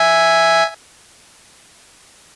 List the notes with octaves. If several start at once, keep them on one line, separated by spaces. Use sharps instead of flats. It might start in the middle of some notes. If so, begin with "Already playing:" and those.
Already playing: E5 G#5